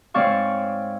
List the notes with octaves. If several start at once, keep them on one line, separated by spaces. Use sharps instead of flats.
G#2 C4 C#5 D5 F5 C#6